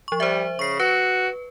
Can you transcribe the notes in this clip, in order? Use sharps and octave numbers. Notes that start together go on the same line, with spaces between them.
F3 C#6
G3 C5 E5
C#3 C#6 C7
F#4 B4